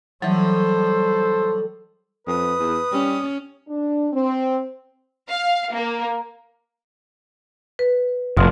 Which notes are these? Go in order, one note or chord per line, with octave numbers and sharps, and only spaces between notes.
A2 E3 F#3 G3 A4 C5
F2 B4 D#6
E2
G3 C#4
D4
C4
F5
A#3
B4
F1 B2 C6 F6